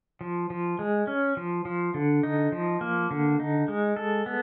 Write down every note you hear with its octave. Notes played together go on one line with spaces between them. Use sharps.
F3
F3
G#3
C#4
F3
F3
D3
D#4
F3
A#3
D3
D#4
G#3
A4
B3